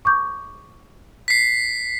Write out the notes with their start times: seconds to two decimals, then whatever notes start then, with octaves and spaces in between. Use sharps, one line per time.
0.05 C#6 D6 G6
1.28 B6 C7